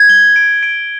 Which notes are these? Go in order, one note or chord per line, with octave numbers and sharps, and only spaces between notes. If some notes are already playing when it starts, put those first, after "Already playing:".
Already playing: G#6
G7
D7
D7